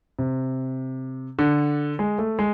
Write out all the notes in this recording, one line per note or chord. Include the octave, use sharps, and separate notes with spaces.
C3
D3
G#3
A3
G#3